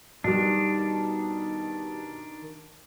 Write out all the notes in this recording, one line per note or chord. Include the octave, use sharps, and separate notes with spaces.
B2 D#3 G3 D4